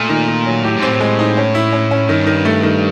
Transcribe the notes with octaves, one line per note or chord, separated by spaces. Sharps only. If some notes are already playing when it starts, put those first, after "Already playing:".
Already playing: A#2 A3
D#3
D#3
F#3
A2 G4
G#2
A2 C4
G#3
D#4
C#4
E4
C#4
C#4
G2 D#3
D#3
A3
D#3